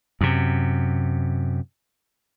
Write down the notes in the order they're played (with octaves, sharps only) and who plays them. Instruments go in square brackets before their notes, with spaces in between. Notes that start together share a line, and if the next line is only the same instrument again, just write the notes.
[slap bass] F#2 C3